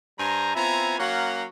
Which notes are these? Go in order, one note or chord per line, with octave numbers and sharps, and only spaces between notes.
G2 G3 C5 G#5 A#5
B3 C4 E4 F4 G#5 A#5
F#3 A#3 C#4 F#4 F5 F#5